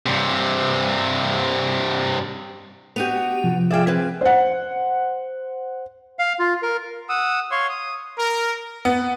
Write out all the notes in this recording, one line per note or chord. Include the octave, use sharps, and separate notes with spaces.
G2 C3
B3 D4 F#4 G4 D#7 F7
C3 F3
F4 G#4 D5 E5 G5
C4 G#4 B4
C5 F#5
F5
F4
A#4
F#5 D#6 E6
C#5 F5 C6 C#6
D#6
A#4
B3